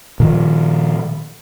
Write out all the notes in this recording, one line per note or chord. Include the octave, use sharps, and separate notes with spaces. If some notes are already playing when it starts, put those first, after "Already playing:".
A#2 D#3 F3